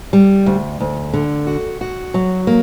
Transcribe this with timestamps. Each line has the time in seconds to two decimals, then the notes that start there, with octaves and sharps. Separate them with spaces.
0.13 G3
0.46 D2
0.80 D2
1.14 D3
1.47 F#4
1.81 F#4
2.14 F#3
2.47 A#3